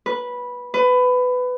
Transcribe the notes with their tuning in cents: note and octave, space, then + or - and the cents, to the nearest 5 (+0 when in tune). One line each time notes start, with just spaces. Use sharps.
B4 -10
B4 +20